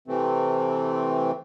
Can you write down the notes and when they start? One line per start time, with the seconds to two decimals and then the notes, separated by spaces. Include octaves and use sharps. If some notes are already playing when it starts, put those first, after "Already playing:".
0.08 C3 E3 A3 C4